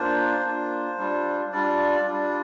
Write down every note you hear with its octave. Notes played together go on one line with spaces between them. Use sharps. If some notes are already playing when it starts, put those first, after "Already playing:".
Already playing: A#3 D4 F4 C5
A#3 D4 F4
G3 D4 F4
G3 D4 F4 D5
G3 D4 F4